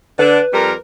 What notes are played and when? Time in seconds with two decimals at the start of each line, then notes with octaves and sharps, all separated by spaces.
0.19 D3 D4 B4
0.53 F2 G3 A#4